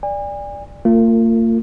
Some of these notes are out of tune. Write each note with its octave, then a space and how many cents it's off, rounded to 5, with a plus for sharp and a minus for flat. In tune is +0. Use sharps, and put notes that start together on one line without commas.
D5 +0 G#5 -40
A#3 -45 F4 +0 A#4 -25